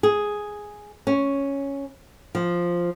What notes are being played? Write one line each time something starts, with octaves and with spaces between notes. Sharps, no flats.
G#4
C#4
F3